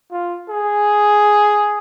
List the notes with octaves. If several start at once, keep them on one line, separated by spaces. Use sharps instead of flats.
F4
G#4